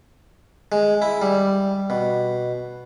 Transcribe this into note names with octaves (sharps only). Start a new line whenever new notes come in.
G#3
E4
G3
B2